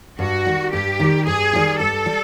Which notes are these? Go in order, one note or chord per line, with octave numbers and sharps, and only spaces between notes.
G2 F#4
D#3 G3
G2 G4
D#3 G3
G2 G#4
D#3 G3
G2 A4
G3